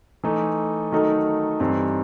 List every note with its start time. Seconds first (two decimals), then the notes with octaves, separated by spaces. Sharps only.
0.24 E3 A3 D#4
0.92 D#3 F#3 A3 D#4 A4
1.60 G2 E3 G3 C4 D#4